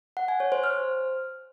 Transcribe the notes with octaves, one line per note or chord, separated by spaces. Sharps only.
F#5
G#5
C#5
C5
F6